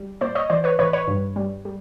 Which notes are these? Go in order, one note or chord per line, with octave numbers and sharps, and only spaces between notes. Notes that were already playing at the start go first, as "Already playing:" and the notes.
Already playing: G3
A#2 C5 D5
C#5 D#5
E3 C5 D5
B4 C#5
A1 B4 C#5
B4 C#5
G2
G3
G3